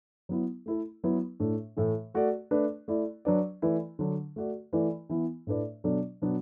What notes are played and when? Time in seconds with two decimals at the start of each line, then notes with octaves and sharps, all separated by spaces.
0.29 F#3 B3 E4
0.66 A3 E4 A4
1.04 F#3 B3 E4 B4
1.40 A2 A3 D4
1.77 A2 E3 A3
2.14 A3 F#4 A4 D5
2.51 A3 D4 B4 D5
2.88 A3 E4 D5
3.25 F#3 D4 B4 D5
3.62 E3 A3 E4 B4 D5
3.99 D3 F#3 D4
4.36 A3 F#4 D5
4.73 E3 A3 E4 B4 D5
5.10 E3 B3 E4
5.47 A2 A3 D4 B4 D5
5.84 B2 F#3 D4 A4 D5
6.22 B2 F#3 B3 D4 F#4